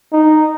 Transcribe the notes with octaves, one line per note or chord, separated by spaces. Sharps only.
D#4